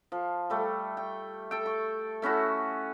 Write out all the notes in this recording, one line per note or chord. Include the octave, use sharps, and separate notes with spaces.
F3
G3 A3
G5
A4 G5
C#6
A3 C#4 E4 F#4